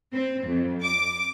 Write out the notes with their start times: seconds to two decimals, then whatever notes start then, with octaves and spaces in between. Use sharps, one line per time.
0.13 C4
0.47 F2
0.84 D6